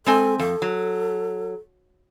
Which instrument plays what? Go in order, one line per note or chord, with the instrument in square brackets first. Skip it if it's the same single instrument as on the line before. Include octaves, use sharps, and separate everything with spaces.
[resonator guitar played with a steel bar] G#3 C4 G#5 [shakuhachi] A4
[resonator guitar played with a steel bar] F2 [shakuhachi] A4
[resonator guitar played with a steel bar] F#3